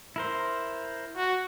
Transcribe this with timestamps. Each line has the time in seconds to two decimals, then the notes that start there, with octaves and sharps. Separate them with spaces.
0.16 E4 A#4 C5
1.17 F#4